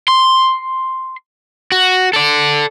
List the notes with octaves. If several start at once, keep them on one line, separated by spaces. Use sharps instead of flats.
C6
F#4
A4 D5